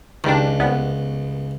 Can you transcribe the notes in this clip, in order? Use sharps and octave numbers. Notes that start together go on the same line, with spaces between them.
C#2 D#3 G3 D4
C2 B3